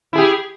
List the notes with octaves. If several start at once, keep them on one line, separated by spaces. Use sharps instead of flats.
E4 G4 G#4